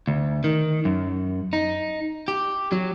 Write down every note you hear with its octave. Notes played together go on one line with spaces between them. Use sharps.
D2
D#3
F#2
D#4
G4
F#3